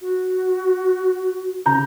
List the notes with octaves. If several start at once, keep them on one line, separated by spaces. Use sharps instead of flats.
F#4
C#3 A#5 G6